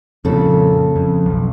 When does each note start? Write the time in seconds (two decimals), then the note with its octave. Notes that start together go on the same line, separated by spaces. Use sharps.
0.25 F2 A#2 C#3 A4
0.96 F2
1.26 B1